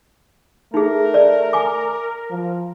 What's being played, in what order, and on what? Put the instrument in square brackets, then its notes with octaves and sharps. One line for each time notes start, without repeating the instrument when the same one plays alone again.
[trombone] A3 [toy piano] D#4 G#4 [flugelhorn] A#4
[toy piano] D5
G#5 D6
[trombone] F3